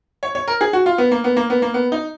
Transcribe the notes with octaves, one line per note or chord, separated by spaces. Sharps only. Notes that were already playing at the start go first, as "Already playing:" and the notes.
C#5
C#5
A#4
G#4
F#4
F4
B3
A#3
B3
A#3
B3
A#3
B3
D#4